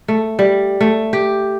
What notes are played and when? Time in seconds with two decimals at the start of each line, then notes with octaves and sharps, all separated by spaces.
0.08 A3
0.39 G3
0.81 A3
1.13 G4